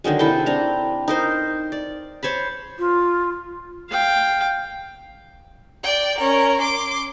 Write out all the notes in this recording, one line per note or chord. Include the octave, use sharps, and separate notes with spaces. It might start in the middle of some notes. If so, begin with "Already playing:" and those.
D3 D#3 F#3 G#3
C3 E4 A4 G5
C4 D4 A#5
D#4 A#4 C5
D5
C5 C#5 A5 B5
F4
F5 G5
D5 G5
C#4 A#4
C6 D6